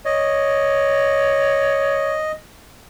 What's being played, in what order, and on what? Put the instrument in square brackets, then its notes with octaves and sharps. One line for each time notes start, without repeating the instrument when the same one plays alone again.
[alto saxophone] C#5 [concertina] D#5